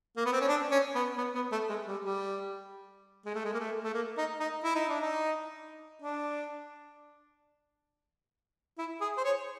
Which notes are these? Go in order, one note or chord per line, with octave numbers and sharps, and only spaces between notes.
A#3
B3
C4
C#4
D4
C#4
B3
B3
B3
A3
G#3
G3
G3
G#3
A3
G#3
A#3
A3
A3
A#3
D#4
D#4
E4
D#4
D4
D#4
D4
E4
G#4
C5
C#5